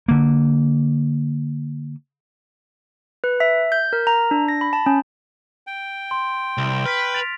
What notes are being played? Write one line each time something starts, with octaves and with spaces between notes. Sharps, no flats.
D3 A#3
B4
E5
G6
A#4
A#5
D4
A#6
B5
A5
C#4
G5
C6
C2
B4 F6 B6
A6 D7 F7